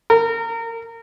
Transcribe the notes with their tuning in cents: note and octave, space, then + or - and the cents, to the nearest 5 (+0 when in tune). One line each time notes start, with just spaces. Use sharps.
A#4 -25